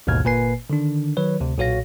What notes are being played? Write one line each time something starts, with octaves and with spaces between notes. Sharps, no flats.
A1 D#2 G#2 B2 F6 G#6
G1 A#2 A#3 B4 G#5 C7
D3 D#3 D4
D#3 F#3 B4 C#5
D2 C3
B1 A#2 F#4 C#5 F5 A#6